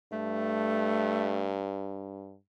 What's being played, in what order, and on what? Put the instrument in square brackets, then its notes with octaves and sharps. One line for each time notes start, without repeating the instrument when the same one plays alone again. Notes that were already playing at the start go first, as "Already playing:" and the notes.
[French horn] G2 [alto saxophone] A3